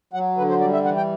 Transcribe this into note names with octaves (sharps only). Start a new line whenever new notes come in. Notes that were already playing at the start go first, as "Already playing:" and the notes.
F#3 F#5
D3 B4
C5
G3 D5
E5
E3 F#5
G5